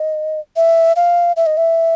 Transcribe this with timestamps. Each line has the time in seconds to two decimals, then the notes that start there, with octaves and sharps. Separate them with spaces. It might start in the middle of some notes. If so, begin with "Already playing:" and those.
Already playing: D#5
0.56 E5
0.96 F5
1.36 E5
1.46 D#5
1.57 E5